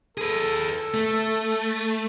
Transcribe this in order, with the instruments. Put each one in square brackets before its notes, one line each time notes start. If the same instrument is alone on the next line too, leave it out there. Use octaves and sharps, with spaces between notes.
[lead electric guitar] G#4 B4 [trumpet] A4
[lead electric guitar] A3